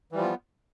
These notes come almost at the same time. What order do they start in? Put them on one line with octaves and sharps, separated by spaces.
E3 G3 F3 F4 B3